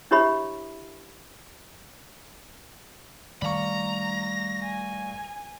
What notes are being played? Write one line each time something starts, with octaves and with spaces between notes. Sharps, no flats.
D4 E4 G4 C#5 E5 B5
D#3 G3 A3 D5 F5 A#5 B5 C#6
G#5